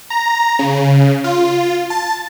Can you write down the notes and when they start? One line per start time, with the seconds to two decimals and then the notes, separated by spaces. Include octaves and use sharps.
0.10 A#5
0.59 C#3
1.24 F4
1.90 A5